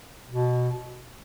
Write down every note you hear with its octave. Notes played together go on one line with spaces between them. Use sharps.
B2